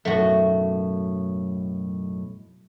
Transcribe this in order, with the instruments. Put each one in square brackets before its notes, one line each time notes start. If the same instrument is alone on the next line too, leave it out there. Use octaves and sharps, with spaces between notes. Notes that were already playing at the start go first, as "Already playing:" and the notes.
[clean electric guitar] B1 F#2 A2 [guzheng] A3 F#4